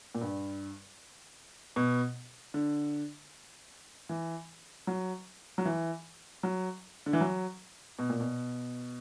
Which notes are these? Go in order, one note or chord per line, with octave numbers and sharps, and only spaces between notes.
A#2
G2
B2
D3
E3
F#3
F#3
E3
F#3
D3
E3
F#3
B2
A#2
B2